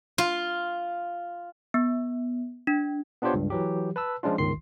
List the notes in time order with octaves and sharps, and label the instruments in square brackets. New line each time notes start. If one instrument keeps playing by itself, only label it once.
[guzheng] F4
[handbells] B3
D4
[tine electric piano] B3 D4 F4 G4 C5 C#5
C#2 G2
E3 F#3 G4
B4 A5 E6
F3 G#3 C#4 D4 F4
G1 C#2 D#3 C6 C7